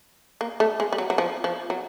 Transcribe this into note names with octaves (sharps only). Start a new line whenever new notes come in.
A#3
A3
G#3
G3
F#3
F#3
F3
F3
F#3